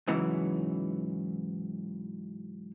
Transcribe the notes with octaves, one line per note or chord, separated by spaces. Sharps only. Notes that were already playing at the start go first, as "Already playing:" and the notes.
G#2 C#3 E3 F#3